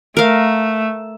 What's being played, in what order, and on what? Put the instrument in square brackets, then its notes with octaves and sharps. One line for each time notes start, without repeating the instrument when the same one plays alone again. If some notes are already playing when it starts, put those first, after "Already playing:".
[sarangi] A3 [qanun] A#4 F5